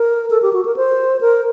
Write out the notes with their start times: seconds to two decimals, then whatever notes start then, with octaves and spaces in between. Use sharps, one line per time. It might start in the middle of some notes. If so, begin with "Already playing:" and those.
Already playing: A#4
0.30 A4
0.42 G4
0.53 F#4
0.65 A#4
0.77 C5
1.21 A#4